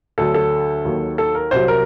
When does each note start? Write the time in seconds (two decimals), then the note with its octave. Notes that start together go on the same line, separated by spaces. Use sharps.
0.18 D2 D3 F#3 A4
0.34 A4
0.85 D#2 D#3 F#3
1.18 A4
1.35 A#4
1.51 C2 C3 F#3 C5
1.68 A#4